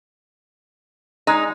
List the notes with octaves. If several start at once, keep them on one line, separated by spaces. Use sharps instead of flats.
G#3 D#4